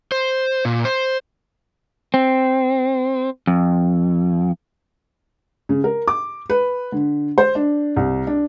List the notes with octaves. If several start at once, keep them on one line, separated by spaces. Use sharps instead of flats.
C5
A#2
C5
C4
F2
C#3
A#4
D6
B4
D3
C5
D4
C2
D4